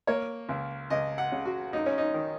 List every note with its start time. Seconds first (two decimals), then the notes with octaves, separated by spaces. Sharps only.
0.07 A#3 C#5
0.49 C#2
0.90 C#2 D#5
1.18 F#5
1.32 C#3
1.45 F#4
1.73 F#2 D#4
1.86 C#4
1.98 D#4
2.14 D#3